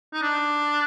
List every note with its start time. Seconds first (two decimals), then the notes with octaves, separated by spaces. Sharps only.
0.13 D#4
0.22 D4